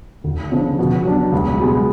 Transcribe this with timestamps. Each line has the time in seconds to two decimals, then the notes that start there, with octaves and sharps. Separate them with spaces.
0.24 D2
0.52 C#3 F3 B3 D4
0.79 B2
1.05 F#3 B3 D4
1.32 C#2
1.60 B2 G#3 B3 F#4